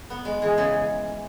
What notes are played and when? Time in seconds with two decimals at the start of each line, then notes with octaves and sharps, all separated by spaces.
0.10 B3
0.25 G#3
0.42 E3 G#4
0.58 C#3